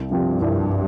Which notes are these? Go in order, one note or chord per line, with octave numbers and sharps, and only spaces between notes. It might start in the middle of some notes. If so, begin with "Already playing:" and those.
Already playing: C2
G2 C3 F3 C4 G4
C2